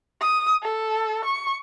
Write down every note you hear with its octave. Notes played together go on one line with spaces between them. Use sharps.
D#6
A4
C#6